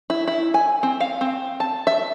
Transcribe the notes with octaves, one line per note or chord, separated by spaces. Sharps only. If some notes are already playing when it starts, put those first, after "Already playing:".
E4
E4
G#5
C4
F5
C4
A5
E5